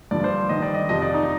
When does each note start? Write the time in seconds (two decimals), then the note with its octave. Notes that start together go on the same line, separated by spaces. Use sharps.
0.11 G2 D3 F3 D5
0.24 C5
0.49 G2 D#3 D#5
0.62 D5
0.74 D#5
0.89 F2 C3 F3 D#5
1.02 D5
1.14 D#4